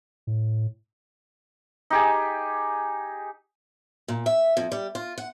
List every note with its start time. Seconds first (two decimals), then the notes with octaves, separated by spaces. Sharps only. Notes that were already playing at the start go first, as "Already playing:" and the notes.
0.27 A2
1.90 D#4 G4 G#4
4.08 A#2
4.26 E5
4.57 F2
4.72 G3
4.95 F4
5.18 F#5